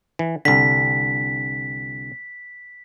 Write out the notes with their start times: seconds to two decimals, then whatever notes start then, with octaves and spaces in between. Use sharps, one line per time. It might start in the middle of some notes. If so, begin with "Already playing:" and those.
0.19 E3
0.45 C2 D3 B6